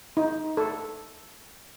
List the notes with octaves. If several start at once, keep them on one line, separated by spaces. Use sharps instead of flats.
D#4
A4